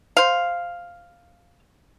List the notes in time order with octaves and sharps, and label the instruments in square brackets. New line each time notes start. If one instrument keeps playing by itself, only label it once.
[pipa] C5 F5